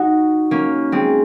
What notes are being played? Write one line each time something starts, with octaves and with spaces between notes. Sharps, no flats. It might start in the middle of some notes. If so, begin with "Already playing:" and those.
Already playing: D#4 F#4
A#3 C#4
G#3 C4